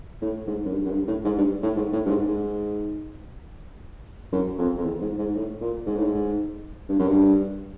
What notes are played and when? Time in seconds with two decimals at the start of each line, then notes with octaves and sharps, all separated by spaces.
0.22 A2
0.47 G#2
0.65 F#2
0.73 G2
0.85 F#2
0.90 G2
1.07 A2
1.24 G#2
1.38 G2
1.63 A2
1.76 G#2
1.93 A2
2.06 G2
2.10 G#2
2.27 G#2
4.32 F#2
4.58 F2
4.78 F2
4.85 E2
5.01 G#2
5.18 G#2
5.35 A2
5.61 A#2
5.86 G#2
5.96 A2
6.05 G#2
6.89 G2
6.99 F#2
7.08 G2